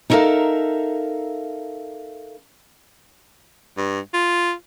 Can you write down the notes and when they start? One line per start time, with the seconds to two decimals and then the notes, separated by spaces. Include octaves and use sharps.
0.10 D#4 E4 A4 A#4 E5 F5
3.77 G2
4.14 F4